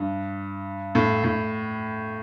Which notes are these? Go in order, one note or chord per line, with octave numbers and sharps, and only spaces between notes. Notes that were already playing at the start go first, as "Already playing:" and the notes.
Already playing: G2
A2
A2